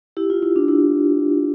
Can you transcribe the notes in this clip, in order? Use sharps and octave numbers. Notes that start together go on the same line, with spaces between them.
E4 G4
F4
E4
D4
E4